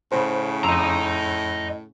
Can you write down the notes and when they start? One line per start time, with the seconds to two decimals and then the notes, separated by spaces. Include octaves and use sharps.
0.12 A2 C#3 C5
0.64 F2 D#5 A#5 C6 E6